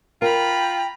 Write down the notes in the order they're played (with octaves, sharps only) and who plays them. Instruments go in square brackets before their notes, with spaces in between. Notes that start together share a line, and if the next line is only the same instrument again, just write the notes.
[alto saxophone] F4 [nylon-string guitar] A#4 [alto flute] G5 [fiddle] A#5 B5